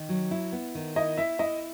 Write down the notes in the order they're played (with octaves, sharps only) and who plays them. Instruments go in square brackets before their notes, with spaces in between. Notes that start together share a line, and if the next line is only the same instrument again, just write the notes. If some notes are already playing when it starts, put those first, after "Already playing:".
Already playing: [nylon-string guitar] D#3
F#3
E4
B3
D#3
[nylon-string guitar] E4 [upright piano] D#5
[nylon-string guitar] E4 [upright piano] E5
[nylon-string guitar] E4 [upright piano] D#5